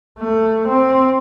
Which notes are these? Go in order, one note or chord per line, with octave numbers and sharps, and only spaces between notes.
A3
C4